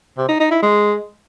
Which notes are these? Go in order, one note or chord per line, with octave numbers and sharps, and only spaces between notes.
C3
D#4
D#4
E4
G#3